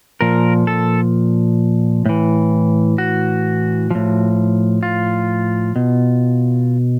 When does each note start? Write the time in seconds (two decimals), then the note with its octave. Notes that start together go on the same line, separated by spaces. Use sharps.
0.21 A#2 F3 A#4
0.67 A4
2.06 A2 E3
2.98 F#4
3.91 A2 F3
4.83 F4
5.76 B2